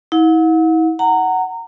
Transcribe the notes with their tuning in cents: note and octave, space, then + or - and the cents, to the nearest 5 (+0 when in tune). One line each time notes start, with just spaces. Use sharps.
E4 -40 F#5 -35
F#5 +10 A#5 -20